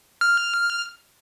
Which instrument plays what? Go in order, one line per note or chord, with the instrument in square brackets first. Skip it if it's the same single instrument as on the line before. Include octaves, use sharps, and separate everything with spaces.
[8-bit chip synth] F6